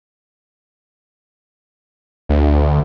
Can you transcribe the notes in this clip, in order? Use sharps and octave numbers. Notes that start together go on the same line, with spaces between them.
D2